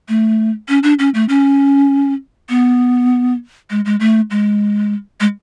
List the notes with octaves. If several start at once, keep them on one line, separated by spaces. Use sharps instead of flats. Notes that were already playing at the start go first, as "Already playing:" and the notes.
A3
C#4
D4
C#4
A3
C#4
B3
G#3
G#3
A3
G#3
G#3